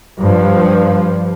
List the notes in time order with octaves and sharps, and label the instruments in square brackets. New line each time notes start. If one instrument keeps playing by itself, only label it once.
[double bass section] G2 F3